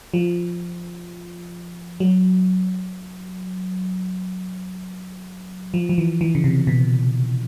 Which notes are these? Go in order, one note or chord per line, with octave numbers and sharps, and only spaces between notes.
F3
F#3
F3
F3
E3
E3
C#3
C3
B2